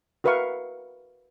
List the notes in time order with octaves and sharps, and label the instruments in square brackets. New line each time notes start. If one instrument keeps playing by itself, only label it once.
[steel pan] F#4 A#4 B4 E5 F5 C#6